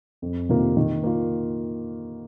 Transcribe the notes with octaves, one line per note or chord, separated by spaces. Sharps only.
F2
C3 D#3 A#3 F4
D#3
A#3 F4